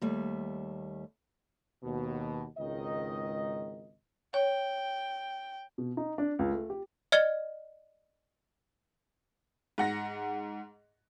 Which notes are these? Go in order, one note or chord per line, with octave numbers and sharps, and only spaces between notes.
D#2 G3 A3
D#2 B2
G#1 C#2 D#3 D#4 D#5
C#5 G5
B2
D#4
D4
C#2
A3
G4
D5 D#5 F6 G#6 C#7 G7
G#2 F#5 A#6